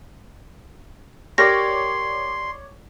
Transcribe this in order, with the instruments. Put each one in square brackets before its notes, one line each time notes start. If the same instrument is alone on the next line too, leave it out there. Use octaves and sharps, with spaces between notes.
[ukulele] G4 A#4 [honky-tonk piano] C#5 D5 [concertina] C6 [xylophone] A#6